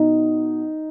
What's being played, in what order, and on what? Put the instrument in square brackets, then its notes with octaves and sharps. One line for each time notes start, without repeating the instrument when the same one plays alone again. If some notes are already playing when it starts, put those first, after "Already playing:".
Already playing: [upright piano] B2 D#4